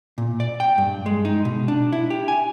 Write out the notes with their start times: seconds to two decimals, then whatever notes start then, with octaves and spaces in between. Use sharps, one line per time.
0.18 A#2
0.40 D5
0.60 G5
0.78 G2
1.06 G#3
1.25 D#4
1.45 B2
1.68 D4
1.92 E4
2.10 G4
2.28 G#5